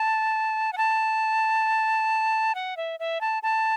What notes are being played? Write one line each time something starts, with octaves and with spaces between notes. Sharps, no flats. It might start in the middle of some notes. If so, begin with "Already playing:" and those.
Already playing: A5
F#5
A5
F#5
E5
E5
A5
A5